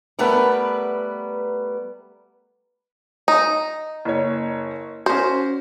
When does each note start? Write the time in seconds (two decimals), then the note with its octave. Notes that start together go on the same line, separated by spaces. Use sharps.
0.19 G3 A3 B3 A#4 B4
3.28 D#4
4.05 F#1 C#5
5.06 C#4 F#4 C5